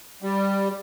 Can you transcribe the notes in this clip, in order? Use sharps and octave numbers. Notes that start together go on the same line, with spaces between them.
G3